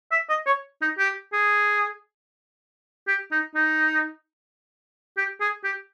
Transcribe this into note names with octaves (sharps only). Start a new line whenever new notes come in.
E5
D#5
C#5
D#4
G4
G#4
G4
D#4
D#4
G4
G#4
G4